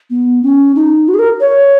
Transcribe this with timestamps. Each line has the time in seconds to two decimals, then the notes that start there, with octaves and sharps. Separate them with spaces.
0.10 B3
0.43 C#4
0.76 D#4
1.08 F#4
1.14 G#4
1.19 A#4
1.40 C#5